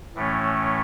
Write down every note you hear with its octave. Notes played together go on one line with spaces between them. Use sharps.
A2 E3 A3 C#4